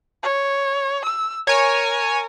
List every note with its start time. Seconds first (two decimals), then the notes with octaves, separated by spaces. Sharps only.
0.23 C#5
1.05 E6
1.47 A#4 C#5 G#5